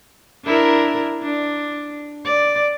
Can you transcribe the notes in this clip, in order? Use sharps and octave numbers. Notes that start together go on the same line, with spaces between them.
D4 E4 A#4
D4
D5